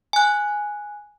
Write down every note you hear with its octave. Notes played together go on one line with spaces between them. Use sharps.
G#5 F#6